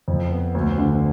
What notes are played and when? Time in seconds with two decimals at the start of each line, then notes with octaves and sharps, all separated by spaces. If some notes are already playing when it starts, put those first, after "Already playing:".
0.08 F2
0.31 B3
0.55 D2
0.78 D3